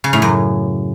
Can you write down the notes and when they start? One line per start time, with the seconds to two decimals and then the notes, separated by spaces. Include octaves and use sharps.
0.04 C#3
0.13 A2
0.22 F#2